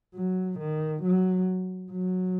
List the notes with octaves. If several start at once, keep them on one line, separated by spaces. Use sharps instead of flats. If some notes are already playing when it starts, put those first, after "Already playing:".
F#3
D#3
F#3
F#3